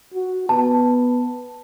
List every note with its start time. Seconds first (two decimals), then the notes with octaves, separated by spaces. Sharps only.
0.14 F#4
0.49 B3 A5